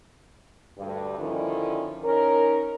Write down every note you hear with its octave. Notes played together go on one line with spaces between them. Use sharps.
D2 G2
D3 D#3 F3 C#4 E4
C#4 D#4 A#4